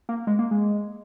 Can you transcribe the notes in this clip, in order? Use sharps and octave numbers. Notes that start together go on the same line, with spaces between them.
A#3
G#3
A#3
G#3